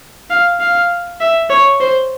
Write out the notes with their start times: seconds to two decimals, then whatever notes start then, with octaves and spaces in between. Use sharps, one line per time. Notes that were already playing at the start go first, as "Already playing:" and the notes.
0.30 F5
0.60 F5
1.21 E5
1.50 C#5
1.80 C5